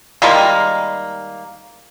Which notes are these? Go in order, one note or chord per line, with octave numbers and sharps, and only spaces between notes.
D#3 G3 G#3 A#3